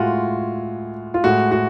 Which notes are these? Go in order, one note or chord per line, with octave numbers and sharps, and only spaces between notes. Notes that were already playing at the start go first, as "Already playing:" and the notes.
Already playing: A2 G#3 F4 F#4
F4
A2 G#3 F#4
F#4